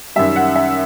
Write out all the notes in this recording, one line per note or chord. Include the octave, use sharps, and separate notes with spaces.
F#2 D#3 G3 E5
F#5
E5